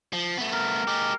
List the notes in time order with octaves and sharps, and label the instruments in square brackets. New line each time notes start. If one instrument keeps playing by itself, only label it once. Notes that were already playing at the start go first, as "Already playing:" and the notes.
[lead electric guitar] F3
A3 B3
[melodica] A#4
[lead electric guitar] G#3 G4